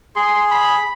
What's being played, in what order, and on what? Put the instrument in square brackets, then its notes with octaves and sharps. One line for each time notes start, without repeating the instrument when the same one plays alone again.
[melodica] G#4 [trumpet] C6
[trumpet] B5